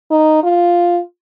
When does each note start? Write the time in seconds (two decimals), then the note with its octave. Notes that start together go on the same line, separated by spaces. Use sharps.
0.11 D#4
0.44 F4